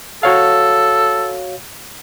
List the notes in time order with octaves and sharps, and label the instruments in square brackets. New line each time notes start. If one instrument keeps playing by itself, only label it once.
[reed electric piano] F#4 C#5 F5 [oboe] A4